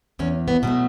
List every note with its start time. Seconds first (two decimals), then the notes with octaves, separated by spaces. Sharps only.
0.19 E2 C#4
0.48 B3
0.63 B2 F#3 A3